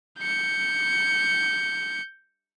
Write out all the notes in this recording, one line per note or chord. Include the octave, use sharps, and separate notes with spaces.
G6 C#7